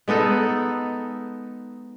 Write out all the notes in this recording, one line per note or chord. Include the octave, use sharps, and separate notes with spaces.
G#3 B3 D#4 A4